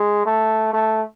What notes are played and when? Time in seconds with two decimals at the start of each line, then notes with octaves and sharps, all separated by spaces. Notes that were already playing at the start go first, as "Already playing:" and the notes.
Already playing: G#3
0.26 A3
0.73 A3